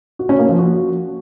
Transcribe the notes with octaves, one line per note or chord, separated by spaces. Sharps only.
F#4
C#4
A#3
F3
F#4